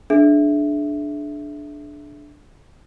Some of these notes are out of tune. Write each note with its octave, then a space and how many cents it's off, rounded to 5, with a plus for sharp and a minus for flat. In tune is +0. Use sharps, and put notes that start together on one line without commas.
D4 +0 G#4 +40 E5 +0